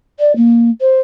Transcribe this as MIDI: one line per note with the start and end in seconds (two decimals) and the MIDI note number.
0.19 0.35 74
0.36 0.69 58
0.80 1.00 72